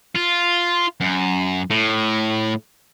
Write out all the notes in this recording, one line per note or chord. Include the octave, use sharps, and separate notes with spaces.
F4
F#2
A2